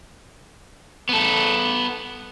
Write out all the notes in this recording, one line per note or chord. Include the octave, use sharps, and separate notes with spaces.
B3 A4